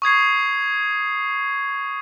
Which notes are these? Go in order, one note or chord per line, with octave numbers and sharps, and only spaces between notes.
C#6 D#6 G#6 C7